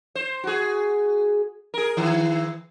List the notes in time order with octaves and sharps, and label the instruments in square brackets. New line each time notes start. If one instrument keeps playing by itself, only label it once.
[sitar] C5
F#4 G#4
G#4 A#4
D#3 E3